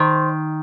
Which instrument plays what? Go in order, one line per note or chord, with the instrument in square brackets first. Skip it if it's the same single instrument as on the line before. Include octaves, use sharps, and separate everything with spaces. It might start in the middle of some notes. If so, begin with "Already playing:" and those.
Already playing: [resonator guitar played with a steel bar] D#3 C5